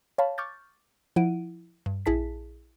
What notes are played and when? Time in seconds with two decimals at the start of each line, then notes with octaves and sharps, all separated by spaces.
0.18 C#5 F5 A5 B5
0.38 C#6 D6 F6 G6 A6
1.16 F3 E4 F#5 D7 D#7
1.86 G2
2.06 A#1 E4 G#4 A5 B6